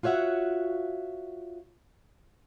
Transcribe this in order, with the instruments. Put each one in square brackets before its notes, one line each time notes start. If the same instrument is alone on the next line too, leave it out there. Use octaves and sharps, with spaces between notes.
[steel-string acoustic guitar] F4 F#4 C#5 E5 F#5